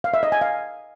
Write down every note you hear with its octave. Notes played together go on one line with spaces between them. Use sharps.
F5
E5
D#5
G#5
F5